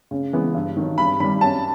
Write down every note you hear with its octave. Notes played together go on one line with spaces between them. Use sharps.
C#3
E3 G#3 B3
G2
D#3 F#3
G2 B5
D#3 G3 B5
F#2 A5